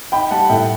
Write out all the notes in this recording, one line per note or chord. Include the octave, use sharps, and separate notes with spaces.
D#4 G5 B5
G3 F#5 A5
A2 E5 G5